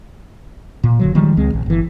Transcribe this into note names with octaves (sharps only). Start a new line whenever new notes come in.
A#2
F#1 D3 F#3
D#3 F3 G3 G#3
C#2 G#3 C4
A#1
G1 E3